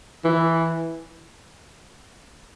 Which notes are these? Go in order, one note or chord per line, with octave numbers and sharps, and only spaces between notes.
E3